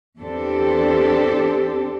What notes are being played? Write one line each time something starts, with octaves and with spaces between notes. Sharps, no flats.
E2 C4 D4 G4 A4